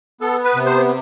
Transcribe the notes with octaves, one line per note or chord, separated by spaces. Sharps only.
B3 A4
B4
C3
C5